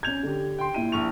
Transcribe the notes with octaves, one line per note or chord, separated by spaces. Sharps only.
C#4 G6 G#6 F7
D3 G4
G5 C6
A#2 E4 D#7
A#1 C#6 F7